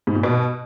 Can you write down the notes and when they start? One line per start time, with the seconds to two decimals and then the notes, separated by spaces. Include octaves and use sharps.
0.07 G#2
0.15 A#2
0.23 B2